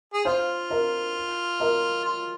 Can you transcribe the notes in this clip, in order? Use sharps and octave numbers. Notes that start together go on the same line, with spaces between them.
G#4
F4 C5 F5
A#4 D#5
A#4 D#5
F4